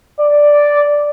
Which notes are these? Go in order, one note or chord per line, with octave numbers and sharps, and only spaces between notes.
D5